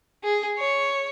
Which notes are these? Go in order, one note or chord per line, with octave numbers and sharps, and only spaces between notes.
G#4
C#5